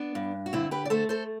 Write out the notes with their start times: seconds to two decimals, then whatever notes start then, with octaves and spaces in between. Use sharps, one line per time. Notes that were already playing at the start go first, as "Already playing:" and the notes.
Already playing: B3 D4
0.15 G2
0.46 F#4
0.53 D3 C4 E4
0.71 G4 B4
0.85 D5
0.90 A3 A4 C5
1.09 A4 C5